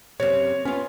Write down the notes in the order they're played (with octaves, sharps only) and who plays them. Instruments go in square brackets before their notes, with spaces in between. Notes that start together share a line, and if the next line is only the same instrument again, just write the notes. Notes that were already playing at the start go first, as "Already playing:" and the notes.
[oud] F#2 C3 [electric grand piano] C#5
[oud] B3 F4 [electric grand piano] C#4